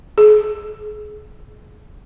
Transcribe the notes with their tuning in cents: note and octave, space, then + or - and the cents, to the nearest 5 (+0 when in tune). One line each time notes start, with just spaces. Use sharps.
G#4 +35